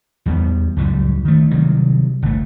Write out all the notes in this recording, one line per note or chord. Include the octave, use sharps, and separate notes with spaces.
E2 G3 B3
C#2 F#2 A2 G3
D#3 A3
C3 D#3 F#3 G3
G1 A3